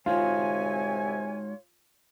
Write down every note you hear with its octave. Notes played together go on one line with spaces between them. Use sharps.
C2 C3 G#3 D#4 F4 F#4 C#5 G#5